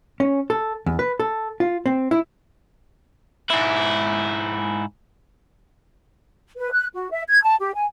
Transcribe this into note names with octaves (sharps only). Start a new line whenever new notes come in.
C#4
A4
E2
B4
A4
F4
C4
E4
G#2 E4
B4
F#6
F#4
E5
G#6
A5
G4
G#5